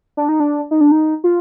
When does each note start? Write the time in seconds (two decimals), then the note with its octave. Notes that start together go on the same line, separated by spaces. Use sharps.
0.17 D4
0.29 D#4
0.40 D4
0.71 D#4
0.81 D4
0.92 D#4
1.24 F4